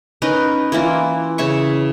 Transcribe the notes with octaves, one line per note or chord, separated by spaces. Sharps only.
C#4 D#4 A#4 B4
E3 A#3 E4 F4
C#3 C#5 E5 C#6